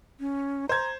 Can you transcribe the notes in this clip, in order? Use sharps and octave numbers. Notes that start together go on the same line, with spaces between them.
C#4
C5 A#5 G#6